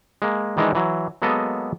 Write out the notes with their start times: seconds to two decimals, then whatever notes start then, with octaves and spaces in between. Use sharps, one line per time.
0.22 G#3 A#3
0.57 D#3 E3 G#3 D4 D#4
0.75 E3 F#3
1.22 F#3 G#3 A#3 B3 A4 D#5